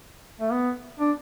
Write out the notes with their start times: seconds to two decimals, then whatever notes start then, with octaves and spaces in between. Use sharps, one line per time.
0.40 A3
0.52 B3
1.00 D4